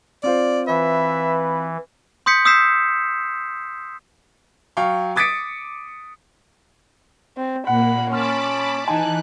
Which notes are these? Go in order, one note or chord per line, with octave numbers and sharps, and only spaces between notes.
C4 F4 C5 D5
E3 B4 E5
C6 D#6 G6 B6 C#7
D#6 E6 G6 B6 C7 E7
F#3 F5 G5 C#6
D6 D#6 A6 B6 C#7 D7
C4
A#2 A#3 F#5 B5
C#4 A5 B5 C6 D6 F6
E3 D#4 G#5 A5 F#6